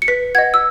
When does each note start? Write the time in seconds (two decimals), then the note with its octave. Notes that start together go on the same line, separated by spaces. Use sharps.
0.02 C#7
0.08 B4 B6
0.35 D#5 F#5 G#6
0.54 E6